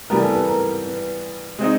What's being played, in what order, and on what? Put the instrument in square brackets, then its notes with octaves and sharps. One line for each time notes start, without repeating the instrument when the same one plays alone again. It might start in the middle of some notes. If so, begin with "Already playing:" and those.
[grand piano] E3 G3 B3 [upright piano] A#4
[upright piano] A4
B4
A#4
B4
[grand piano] G#3 C4 D#4